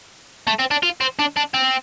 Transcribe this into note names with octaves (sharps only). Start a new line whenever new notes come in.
A3
C4
D4
F4
C4
D4
D4
C4